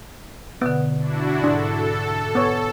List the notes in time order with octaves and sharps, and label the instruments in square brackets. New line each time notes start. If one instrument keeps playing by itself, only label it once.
[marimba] B2 D3 [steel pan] B3
[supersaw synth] D4 E4 F#4
[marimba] G#2 [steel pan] D4 [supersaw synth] A4
[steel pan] B3 C#5